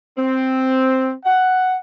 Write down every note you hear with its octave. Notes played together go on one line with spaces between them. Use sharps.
C4
F#5